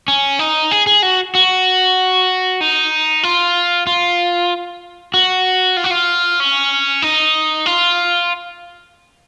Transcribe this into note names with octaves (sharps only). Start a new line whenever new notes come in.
C#4
D#4
G#4
G#4
F#4
F#4
D#4
F4
F4
F#4
F4
F#4
F4
C#4
D#4
F4